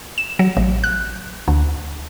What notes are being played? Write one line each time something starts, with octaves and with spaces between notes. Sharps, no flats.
E7
F#3
A1
F#6
D2